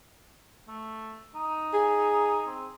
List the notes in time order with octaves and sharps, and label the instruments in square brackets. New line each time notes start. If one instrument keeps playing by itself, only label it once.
[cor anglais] A3
D#4
[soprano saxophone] G#4
[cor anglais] C4